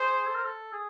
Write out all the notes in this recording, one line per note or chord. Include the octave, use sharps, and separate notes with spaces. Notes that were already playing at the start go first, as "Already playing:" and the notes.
Already playing: G#4 C5
A4
A#4
A4
G#4